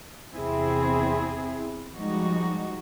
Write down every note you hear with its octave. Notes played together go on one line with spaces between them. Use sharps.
E2 C3 C4 E4 G#4
F3 G3 G#3 D#4 F#4